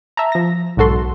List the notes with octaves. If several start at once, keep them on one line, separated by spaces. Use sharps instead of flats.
E5 A5 A#5
F3 A#6
B1 G#2 F#4 A4 C6